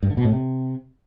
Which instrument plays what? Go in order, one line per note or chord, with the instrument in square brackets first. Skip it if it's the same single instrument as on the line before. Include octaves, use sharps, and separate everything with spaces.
[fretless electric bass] G2
D3
B2
A2
C3